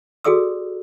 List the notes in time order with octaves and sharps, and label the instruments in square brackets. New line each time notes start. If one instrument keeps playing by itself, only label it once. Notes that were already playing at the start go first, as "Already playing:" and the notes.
[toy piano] F#4 G#4 A4 D5 D#6 E6